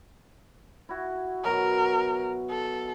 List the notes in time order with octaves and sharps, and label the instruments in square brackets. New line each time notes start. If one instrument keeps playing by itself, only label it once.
[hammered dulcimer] E4 F#4
[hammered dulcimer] B2 F#3 [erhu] A#4
[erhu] A4